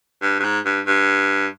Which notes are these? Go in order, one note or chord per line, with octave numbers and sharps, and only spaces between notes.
G2
G2
G#2
G2
G2